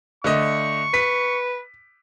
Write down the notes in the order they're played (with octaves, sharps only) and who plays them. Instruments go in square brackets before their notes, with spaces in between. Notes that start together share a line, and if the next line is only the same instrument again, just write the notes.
[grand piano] D3 A3 D#5 [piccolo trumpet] C#6
[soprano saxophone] B4 [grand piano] B6